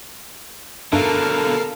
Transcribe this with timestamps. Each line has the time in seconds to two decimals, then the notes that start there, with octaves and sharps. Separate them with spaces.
0.92 G2 B2 D3 D4 A4 A#4 E5 F5